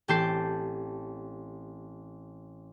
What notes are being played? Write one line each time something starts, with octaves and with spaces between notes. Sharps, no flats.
A1 C4 G4 A5 G6 C7